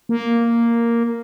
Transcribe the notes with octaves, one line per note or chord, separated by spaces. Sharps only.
A#3